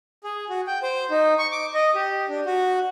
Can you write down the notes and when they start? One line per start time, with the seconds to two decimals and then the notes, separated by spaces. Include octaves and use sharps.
0.24 G#4
0.49 F#4
0.67 G5
0.83 C5
1.10 D#4
1.39 C#6
1.52 D6
1.74 D#5
1.95 G4
2.29 D4
2.46 F#4